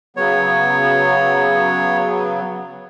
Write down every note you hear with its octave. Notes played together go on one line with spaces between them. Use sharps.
C#3 F#3 B3 C#5